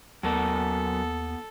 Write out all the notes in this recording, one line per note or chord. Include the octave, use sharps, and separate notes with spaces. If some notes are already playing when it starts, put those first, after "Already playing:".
D#2 F#3 B3 A4 A#4 A5